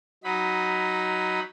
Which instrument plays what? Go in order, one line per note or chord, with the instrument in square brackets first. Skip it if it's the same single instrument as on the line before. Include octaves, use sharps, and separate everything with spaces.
[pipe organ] F#3 D#4 B5